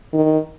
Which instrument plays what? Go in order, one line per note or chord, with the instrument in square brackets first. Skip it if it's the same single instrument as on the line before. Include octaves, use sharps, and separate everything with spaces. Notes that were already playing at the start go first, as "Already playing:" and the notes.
[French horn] D#3